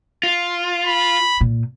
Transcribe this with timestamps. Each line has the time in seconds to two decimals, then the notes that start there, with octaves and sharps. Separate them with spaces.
0.23 F4
0.87 B5
1.41 A#2